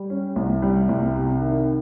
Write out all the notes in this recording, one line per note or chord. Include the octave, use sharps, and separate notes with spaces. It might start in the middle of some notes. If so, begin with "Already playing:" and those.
Already playing: G3
C#4
C2
G3
C2
C3
D#3